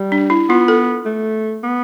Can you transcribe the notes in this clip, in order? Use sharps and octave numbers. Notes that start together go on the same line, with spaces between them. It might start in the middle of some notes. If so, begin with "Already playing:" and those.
Already playing: G3
D4
E4
B3 F4
A4
A3
B3